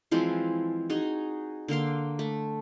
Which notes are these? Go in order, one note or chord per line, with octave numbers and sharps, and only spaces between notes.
E3 F3 G#3 C4
D#4 F#4 G#4
D3 A#3 F5 C6
A3